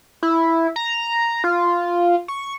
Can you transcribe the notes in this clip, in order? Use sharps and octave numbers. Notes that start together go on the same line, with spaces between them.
E4
A#5
F4
C#6